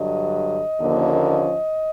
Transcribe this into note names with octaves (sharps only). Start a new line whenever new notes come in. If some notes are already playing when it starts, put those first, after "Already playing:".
Already playing: G2 D3 F#3 D#5
D#2 D3 F3 A#3 C#4